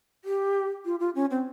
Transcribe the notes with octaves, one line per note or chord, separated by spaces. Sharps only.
G4
F4
F4
C#4
C4